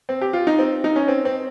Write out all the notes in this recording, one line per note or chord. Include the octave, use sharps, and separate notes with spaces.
C4
G4
F4
D#4
C4
D#4
C#4
C4
C4